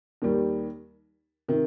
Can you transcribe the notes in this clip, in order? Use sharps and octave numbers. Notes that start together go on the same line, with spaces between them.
D#2 D#3 G3
C3 D#3